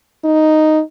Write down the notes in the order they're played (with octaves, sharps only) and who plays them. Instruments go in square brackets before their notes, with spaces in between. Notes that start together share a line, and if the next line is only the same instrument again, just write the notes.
[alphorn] D#4